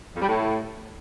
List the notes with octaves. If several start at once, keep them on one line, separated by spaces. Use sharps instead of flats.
F2
G3
A2